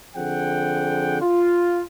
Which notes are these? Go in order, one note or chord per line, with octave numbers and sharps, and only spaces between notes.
D3 F3 C4 G#4 F#5 G5
F4